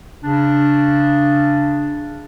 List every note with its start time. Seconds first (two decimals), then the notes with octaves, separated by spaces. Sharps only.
0.22 C#3 D4